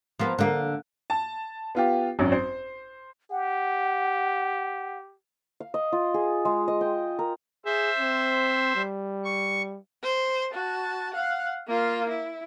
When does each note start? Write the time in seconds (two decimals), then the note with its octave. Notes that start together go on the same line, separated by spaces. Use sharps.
0.20 F3 A#3 B3
0.39 D3 A#3
1.10 A5
1.75 B3 F4 G4
2.19 G#1 F#2 C#4
2.32 C5
3.31 G4 F#5
5.60 F5
5.74 D#5
5.92 F4
6.14 G#4
6.45 G#3
6.68 D#5
6.81 G5
7.19 A#4
7.65 G#4 C5 E5
7.99 C4
8.76 G3
9.24 C#6
10.03 C5
10.53 F#4 A5
11.14 F5 F#5
11.67 A#3 F4
12.10 E4